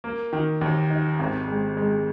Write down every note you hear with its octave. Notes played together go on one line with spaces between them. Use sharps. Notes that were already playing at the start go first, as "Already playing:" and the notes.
A#3
D#3
D#2
D#4
G#1
G#3
G#3